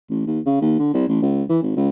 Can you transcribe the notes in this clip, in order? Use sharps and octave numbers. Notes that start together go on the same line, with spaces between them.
A1
D#2
C#3
D#2
D3
C2
A1
C#2
E3
G#1
C#2